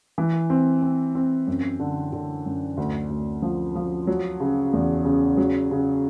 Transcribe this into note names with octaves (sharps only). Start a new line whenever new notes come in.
E3
C4
C4
C4
F#2
D3
D3
F#2
D2
D2
F3
F3
F#3
C#3
E2
C#3
F#3
C#3